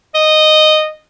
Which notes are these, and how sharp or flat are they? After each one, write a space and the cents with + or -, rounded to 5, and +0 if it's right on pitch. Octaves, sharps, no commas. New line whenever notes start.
D#5 -10